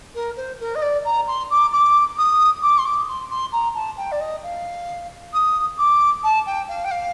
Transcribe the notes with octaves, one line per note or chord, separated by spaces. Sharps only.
A#4
C5
A#4
D#5
D5
A#5
C6
D6
D6
D#6
D6
C6
D6
C6
C6
A#5
A5
G5
D5
D#5
F5
D#6
D6
A5
G5
F5
G5
F5